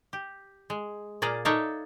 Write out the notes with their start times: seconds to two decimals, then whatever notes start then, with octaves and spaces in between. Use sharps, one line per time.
0.13 G4
0.70 G#3
1.22 A#2 A#3 G#4 D5 A#5
1.45 D#4 A4 C#5 D5 E5 F5